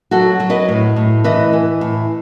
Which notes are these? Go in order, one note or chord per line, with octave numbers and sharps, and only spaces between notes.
F#3 F#4 A4
F#3
B4 D#5
A2
A2
E3 B4 D#5
E3
A2